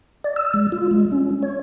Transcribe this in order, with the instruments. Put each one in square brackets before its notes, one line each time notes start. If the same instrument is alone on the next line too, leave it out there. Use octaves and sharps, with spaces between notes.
[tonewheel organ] D5
E6
G#3
F4
G#3
C#4
C#5